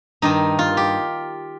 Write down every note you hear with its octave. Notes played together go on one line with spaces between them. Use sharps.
G2 D#3 D#4
F4
G4